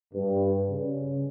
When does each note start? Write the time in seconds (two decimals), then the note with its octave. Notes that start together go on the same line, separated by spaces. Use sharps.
0.14 G2
0.70 C#3